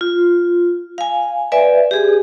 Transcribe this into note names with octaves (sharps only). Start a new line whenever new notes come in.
F4
F5 G#5
B4 D5 E5 G#5
G4 G#4